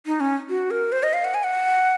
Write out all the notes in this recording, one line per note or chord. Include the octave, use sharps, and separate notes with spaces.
D#4
C#4
F#4
A#4
C5
D#5
F5
F#5
G#5
F#5